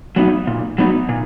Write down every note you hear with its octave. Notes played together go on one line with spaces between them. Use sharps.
F#3 B3 D#4
A#2
F#3 B3 D#4
A#2